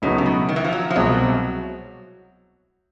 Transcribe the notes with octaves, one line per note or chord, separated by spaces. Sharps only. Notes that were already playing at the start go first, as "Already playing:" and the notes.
C#2 A2 C#3 F#3 B3 D#4
C3
B2
D#3
E3
F3
F#3
F3
C2 B2 F#3 G#3 C4